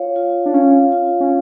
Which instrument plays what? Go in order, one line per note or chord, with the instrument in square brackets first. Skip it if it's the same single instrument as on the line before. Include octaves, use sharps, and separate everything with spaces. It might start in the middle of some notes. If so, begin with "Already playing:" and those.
Already playing: [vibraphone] F4 C#5 F5
F4
[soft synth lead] D4
[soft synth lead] C#4 [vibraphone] F5
[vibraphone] F4
[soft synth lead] C#4